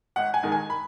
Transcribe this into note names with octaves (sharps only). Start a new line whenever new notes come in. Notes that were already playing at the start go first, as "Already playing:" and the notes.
G#1 F#5
G#5
G#2 D#3 G#3 D#4
G#5
B5